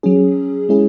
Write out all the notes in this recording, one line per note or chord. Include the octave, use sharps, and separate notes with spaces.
F#3 C#4 G#4
G#3 C#4 E4 G#4